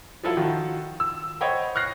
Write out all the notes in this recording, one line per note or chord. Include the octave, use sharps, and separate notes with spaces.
F3 F#3 E4 F4 A4
D#3 F4 F#4
E6
C5 C#5 D#5 F#5 G5 B5
C#6 F6 F#6 A#6 C7